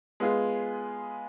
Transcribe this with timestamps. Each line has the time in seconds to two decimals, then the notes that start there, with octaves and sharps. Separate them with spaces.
0.20 G#3 B3 F4 G#4